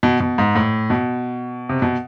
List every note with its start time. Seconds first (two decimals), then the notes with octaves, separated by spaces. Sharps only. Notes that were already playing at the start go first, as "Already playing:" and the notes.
0.03 B2
0.20 B2
0.38 G#2
0.55 A2
0.90 B2
1.69 C3
1.82 B2